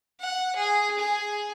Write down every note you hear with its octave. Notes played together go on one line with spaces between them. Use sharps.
F#5
G#4
G#4